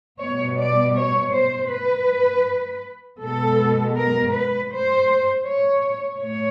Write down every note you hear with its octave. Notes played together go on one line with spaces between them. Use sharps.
B2 G3 B3 C#5
D5
C#5
C5
B4
B2 G#3 B3 A4
A#4
B4
C5
C#5
A2 C#5